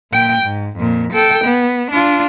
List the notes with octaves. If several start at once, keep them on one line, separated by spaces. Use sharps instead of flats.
A#2 G5
G#2
F2 A#2
A4 G5
B3
D4 F4